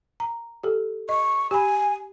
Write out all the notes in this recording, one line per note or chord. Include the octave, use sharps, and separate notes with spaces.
A#5
G4 A4
D#5 C#6
G4 G#5 B5